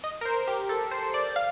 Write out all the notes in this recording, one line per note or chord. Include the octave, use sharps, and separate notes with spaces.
D#5
A#4
C5
G4
A4
C5
D5
F5